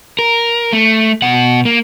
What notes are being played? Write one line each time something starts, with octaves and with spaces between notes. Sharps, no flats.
A#4
A3
B2 F#5
A#3